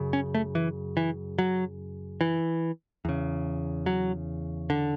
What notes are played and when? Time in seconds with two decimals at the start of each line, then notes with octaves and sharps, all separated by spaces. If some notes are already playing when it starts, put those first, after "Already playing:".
Already playing: F#2 C#3
0.13 C#4
0.35 A3
0.55 E3
0.97 E3
1.39 F#3
2.21 E3
3.05 E2 C#3
3.86 F#3
4.70 D3